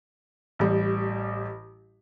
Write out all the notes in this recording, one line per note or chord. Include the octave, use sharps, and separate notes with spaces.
A1 G3